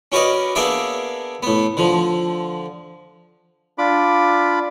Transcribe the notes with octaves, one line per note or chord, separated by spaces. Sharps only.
C#4 F#4 A#4 B4 D5 D#5
A#3 B3 D4 G#4 D5 E5
A2 B3
D3 F3
D4 F4 B5 D6